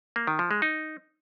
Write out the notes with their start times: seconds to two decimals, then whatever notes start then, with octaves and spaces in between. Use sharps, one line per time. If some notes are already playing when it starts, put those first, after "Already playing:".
0.16 A#3
0.27 D#3
0.39 F3
0.51 G#3
0.62 D#4